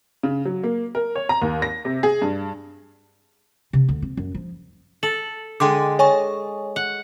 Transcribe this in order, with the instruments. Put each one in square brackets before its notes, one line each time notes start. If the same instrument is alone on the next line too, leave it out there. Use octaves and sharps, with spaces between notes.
[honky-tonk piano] C#3
F#3
A#3
A#4
C#5
A#5
D#2
A#6
C3
G#4
G2
[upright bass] C3
D2
C4
F#2
F3
[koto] A4 [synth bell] F#7
[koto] D3 G#3 [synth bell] G5 C6 D6
[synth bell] C#5 G#5 C#6 [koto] D#5
[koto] F#5